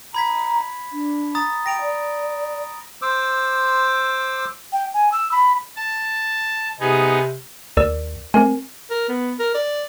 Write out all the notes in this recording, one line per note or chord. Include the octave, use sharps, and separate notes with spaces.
A#5 B5 G#6 B6
D4
A#5 D#6 A6
G5 A#6 D7 F7
D5
C5 D6 E6
G5
G#5
E6
B5
A5
C3 B3 D#4 G#4
D#2 A#4 D5 E6
A3 C4 A#4 G#5
A#4
B3
A#4
D5